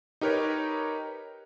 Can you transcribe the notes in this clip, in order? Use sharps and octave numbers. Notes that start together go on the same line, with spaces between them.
D#4 G4 A#4 B4 C#5